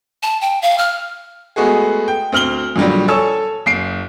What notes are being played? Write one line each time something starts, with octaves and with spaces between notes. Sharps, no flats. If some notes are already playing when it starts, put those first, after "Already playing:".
A5
G5
F5
F6
G#3 A3 B3 F#4 G#4
G5
D2 C4 F6 F#7 G7
F2 A#2 D3 F#3 G3
A4 C#5 G#5 A5 E6
F#1 C7 D7